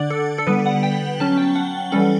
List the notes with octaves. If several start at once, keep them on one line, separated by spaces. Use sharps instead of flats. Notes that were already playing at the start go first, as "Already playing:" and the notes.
Already playing: D3 D4 D5 F#5
A4
A4
D3 G3 B3 B4
F#5
G5
F#3 C#4 A5
G5
F#5
E3 G3 C#4 A4